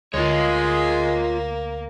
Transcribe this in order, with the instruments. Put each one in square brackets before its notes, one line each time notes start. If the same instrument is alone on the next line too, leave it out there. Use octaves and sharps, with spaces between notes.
[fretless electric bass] D2 [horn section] G#3 [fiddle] A#3 [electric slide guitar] F4 C#5